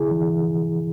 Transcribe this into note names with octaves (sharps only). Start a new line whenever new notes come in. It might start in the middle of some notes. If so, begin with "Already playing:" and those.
Already playing: D3 E4 G#4
E3
E3